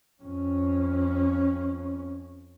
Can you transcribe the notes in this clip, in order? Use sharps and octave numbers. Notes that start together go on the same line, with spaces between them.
F2 C#4